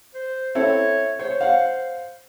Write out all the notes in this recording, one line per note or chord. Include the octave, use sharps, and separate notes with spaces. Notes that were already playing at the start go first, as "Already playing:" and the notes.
C5
C4 E4 A4 C#5
C5 C#5
F5 F#5